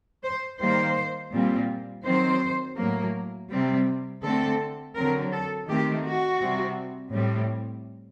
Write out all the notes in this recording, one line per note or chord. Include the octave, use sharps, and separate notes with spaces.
C5
D#3 G3 A#3 C5
A#2 G3 C4
D#3 F#3 C4 C5
A2 F#3 A#3
C3 G3 C4
D3 A3 C4 A4
D3 F#3 C4 A#4
A4
D#3 A3 C4 G4
F#4
C3 G3 C4
A2 G3 C4